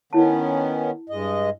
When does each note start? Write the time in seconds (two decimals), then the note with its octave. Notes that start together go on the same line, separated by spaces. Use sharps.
0.13 D#3 B3 C#4 E4 A5
1.10 G2 G#3 D#5